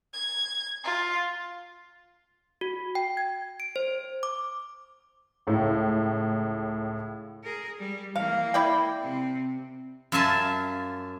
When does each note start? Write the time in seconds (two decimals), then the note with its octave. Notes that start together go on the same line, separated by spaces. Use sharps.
0.13 G#6
0.83 F4
2.61 F#4
2.95 G5
3.17 G#6
3.60 D7
3.76 C5
4.23 D6
5.47 C#2 A2
7.43 G#4 A#4
7.79 G3
8.16 E3 A#3 F5
8.54 E4 D5 G5
9.00 C3 C4
10.12 F#2 F4 E5 G#5 A5